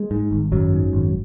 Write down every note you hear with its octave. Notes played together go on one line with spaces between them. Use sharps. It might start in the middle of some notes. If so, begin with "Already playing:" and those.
Already playing: G#3
G#2
G#1
G#1 F#2 F#3
G#2
G#1